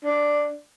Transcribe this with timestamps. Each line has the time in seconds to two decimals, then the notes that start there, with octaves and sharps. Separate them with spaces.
0.04 D4